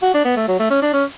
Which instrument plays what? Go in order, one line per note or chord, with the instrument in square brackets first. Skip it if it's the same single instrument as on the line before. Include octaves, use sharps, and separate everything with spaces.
[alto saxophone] F#4
D4
B3
A3
F#3
A3
C#4
D4
C#4